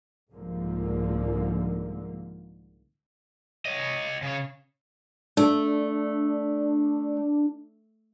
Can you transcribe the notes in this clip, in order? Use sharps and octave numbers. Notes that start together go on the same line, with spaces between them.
C2 G#2 D3 F3 A#3
C#5 D#5
C#3 C#5
A3 D4